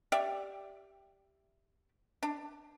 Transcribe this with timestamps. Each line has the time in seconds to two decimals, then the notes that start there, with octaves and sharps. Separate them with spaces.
0.12 G4 D5 E5
2.23 D4